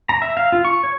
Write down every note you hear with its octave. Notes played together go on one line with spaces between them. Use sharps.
A#5
E5
F5
F4
C#6
C#5